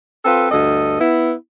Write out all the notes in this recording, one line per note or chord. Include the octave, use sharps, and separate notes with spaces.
C4 F4 A4 B4
D2 G2 A4 D#5
B3 E4